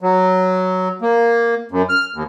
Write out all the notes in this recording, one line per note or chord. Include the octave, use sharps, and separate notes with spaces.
F#3
A#3
F#2
F6
D#2